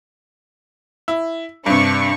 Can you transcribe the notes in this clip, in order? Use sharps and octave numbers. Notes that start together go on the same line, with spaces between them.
E4
G2 C3 D4 C#6